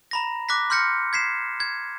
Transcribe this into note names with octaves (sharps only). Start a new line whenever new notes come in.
A#5 B5 A#6
D6 F#6 A#6 B6
C6 F6 G6 A#6 C#7
G#6 B6 C7 E7
G#6